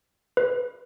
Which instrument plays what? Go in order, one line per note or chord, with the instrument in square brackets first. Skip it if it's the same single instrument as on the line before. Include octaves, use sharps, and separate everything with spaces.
[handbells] B4